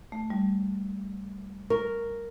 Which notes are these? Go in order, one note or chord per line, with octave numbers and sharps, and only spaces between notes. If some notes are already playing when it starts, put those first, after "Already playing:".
A3
G3
A#4 C#6